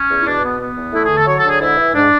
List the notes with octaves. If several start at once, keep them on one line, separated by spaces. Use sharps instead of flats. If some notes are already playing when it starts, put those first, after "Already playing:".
Already playing: C#4
E2
E4
B2 D4
B3
B3
E2
A3 E4
D3 G#4
A4
F#3 C#5
A4
D3
G#4
G#2 E4
E3
G#2 D4